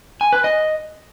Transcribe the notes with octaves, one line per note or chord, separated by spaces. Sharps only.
G#5
B4
D#5